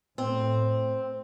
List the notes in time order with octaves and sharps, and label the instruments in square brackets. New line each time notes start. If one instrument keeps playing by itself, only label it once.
[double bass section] A2 [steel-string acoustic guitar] C4